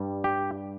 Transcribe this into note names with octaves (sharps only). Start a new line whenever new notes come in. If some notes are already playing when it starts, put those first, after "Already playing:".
Already playing: G2 G3
G4